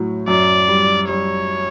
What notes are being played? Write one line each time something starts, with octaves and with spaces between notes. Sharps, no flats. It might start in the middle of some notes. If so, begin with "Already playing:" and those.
Already playing: A2 F#3
F#2 D5
G3
G3 C#5